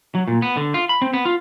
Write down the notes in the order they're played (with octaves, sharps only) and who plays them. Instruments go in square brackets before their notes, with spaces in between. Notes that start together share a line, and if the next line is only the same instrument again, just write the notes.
[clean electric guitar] F#3
A#2
B3
D3
F4
B5
C4
B3
F4